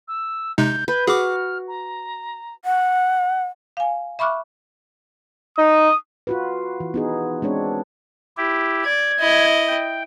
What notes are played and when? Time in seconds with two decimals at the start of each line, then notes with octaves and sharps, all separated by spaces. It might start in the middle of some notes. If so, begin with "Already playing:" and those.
0.08 E6
0.58 C3 G#3 D#4 G6
0.88 B4 G6
1.07 F#4 G#4 D6 F6
1.68 A#5
2.64 F#5
3.77 F5 G#5
4.19 E5 B5 C#6 D6 F6 F#6
5.58 D#4 D#6
6.27 F4 F#4 B4
6.80 E3
6.94 B3 D#4 G#4
7.42 G#3 C4 D4 C#5
8.37 E4 G4
8.84 D5 G#6
9.19 E4 D#5
9.68 G5